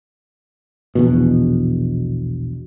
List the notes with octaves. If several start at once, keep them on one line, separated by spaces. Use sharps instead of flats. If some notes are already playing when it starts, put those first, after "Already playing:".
A#1 E2 B2